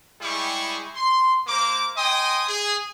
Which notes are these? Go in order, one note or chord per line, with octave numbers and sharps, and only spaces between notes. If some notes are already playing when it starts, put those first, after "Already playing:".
G3 G#3 E4 G4 G#4 C#6
C6
A#3 C5 A#5 D6
D#5 G5 G#5 C6 D#6
G#4